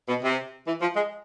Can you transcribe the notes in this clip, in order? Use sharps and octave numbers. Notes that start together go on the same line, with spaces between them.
B2
C3
E3
F3
G#3